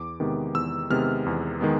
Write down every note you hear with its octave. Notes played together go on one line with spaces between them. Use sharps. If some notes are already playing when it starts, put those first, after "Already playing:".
Already playing: E2 D6
C3 D#3 G#3 B3
E2 E6
C3 D#3 G#3 B3 F6
E2
D#3 G#3 B3